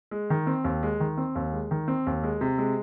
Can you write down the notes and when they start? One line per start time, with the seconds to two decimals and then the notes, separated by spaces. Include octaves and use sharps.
0.11 G#3
0.30 D#3
0.47 C4
0.64 D#2
0.83 G#3
1.00 D#3
1.17 C4
1.35 D#2
1.52 G#3
1.71 D#3
1.88 C4
2.07 D#2
2.23 G#3
2.41 C3
2.58 G#3